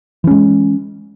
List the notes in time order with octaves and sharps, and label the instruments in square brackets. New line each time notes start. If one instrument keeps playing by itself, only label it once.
[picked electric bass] E3
C#4
G#3